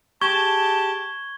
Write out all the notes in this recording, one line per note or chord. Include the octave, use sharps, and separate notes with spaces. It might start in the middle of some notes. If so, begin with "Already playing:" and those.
G4 G#4 A5 C#6 G#6 G7